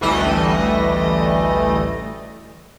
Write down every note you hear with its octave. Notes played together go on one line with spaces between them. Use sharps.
A1 D2 E3 G3 A3 D#5